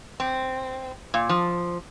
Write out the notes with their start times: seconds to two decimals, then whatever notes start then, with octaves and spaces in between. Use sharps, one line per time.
0.20 C4
1.14 A#2
1.29 F3